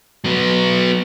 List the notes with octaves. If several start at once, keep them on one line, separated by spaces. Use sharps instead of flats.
F#3 B3